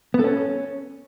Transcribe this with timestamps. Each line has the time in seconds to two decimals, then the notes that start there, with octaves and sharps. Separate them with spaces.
0.14 B3
0.19 A4
0.24 C#4